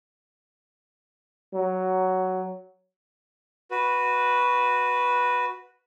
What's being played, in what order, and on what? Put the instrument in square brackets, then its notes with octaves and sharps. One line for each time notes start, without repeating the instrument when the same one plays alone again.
[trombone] F#3
[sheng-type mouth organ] F#4 B4